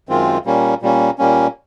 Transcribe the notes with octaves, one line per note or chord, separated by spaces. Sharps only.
F#2 D#3 G#3 C4 F4
A#2 G3 A#3 C#4
A#2 G3 A#3 C#4
A#2 G3 A#3 C#4